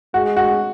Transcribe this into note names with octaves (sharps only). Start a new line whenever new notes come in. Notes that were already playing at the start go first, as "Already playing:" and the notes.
G#3 F#4
F#4